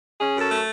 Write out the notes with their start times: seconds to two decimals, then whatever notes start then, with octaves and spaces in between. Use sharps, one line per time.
0.20 C#4 G#4
0.36 F#2
0.41 A4
0.50 A3